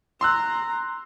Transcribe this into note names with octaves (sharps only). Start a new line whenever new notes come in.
A#5 C6 E6 F#6